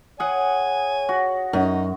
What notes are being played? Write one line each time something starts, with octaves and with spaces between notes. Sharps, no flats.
G#4 C#5 F#5 G#5
F#4
F#2 D#4